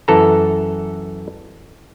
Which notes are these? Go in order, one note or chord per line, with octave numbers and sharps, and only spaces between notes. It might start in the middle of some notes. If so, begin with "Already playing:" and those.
F#2 E3 A4 A#5